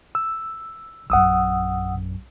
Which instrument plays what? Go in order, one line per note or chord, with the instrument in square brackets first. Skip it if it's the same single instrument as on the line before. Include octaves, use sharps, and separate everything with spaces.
[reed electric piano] E6
[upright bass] A#1 F#2 [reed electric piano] F#5 D#6 E6